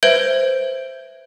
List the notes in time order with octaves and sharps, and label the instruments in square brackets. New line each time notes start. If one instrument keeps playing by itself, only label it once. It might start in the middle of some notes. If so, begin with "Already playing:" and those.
[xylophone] B4 C5 E5 G6 G#6 D7